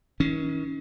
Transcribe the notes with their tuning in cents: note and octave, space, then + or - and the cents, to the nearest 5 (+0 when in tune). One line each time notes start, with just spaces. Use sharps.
D#3 +40 C#4 +0